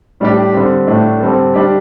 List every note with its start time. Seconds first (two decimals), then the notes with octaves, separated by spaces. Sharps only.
0.20 A2 G3 D4 G4
0.54 D3 G3 C4
0.87 A2 A3 D4
1.20 D3 G3 C4 A4
1.54 G3 D4 G4